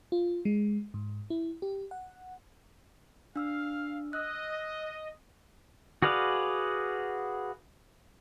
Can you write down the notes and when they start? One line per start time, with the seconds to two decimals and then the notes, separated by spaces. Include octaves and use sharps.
0.12 F4
0.45 G#3
0.94 G#2
1.30 E4
1.62 G4
1.91 F#5
3.36 D4 F5 E6 F6
4.13 D#5 E6 F#6
6.02 F#4 G#4 B4 D5 F5